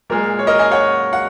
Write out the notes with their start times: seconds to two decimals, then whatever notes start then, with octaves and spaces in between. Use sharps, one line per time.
0.10 A#2 G#3 A#4
0.39 C#5
0.47 A#4 D#5
0.59 D#5 G#5
0.71 C#5 F#5
1.13 F#5